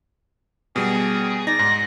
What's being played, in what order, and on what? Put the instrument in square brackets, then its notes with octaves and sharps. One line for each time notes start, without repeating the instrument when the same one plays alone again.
[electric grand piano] B2 G3 [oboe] G#4
[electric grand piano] D#4 [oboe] D5 [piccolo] A#6
[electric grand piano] G#2